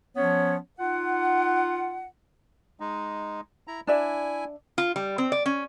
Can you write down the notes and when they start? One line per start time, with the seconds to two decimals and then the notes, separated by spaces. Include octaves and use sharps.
0.16 F3 B3 C#4 C#5
0.79 D#4 F4 F#5
2.80 G#3 D#4
3.67 E4 A#5
3.87 D4 E4 D5 E5 G#5
4.78 F4
4.96 G3
5.18 C4
5.32 D5
5.46 C#4